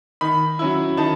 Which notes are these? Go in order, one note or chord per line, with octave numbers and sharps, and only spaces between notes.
D#3 B5
F#3 C#4 E4
D#3 A5